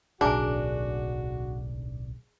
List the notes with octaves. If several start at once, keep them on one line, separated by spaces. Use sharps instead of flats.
D1 B1 D4 F#4 G#4 A#4 E5 G#5